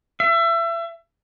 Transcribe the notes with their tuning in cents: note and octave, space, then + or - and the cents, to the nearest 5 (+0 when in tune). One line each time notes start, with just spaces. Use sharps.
E5 +30